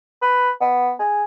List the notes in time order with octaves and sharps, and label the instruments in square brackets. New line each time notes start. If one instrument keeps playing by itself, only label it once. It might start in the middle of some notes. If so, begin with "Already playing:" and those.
[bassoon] B4
B3
G#4